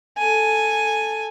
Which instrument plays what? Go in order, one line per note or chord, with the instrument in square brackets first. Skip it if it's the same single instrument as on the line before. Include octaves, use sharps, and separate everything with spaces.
[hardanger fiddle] A4 G#5